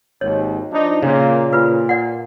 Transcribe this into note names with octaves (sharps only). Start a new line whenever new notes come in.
G#1 D#2 C#5
F3 D4 D#4
A#2 C#3 A#3
A#2 F4 B4
D5 F#5